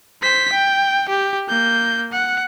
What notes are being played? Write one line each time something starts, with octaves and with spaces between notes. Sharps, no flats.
C5 B6
G5
G4
A#3 G6
F#5